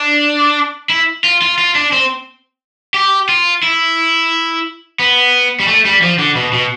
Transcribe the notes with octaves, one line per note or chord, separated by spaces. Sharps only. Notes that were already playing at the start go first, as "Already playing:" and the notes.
Already playing: D4
E4
F4
F4
F4
D4
C4
G4
F4
E4
B3
G3
A3
G3
F3
D3
B2
B2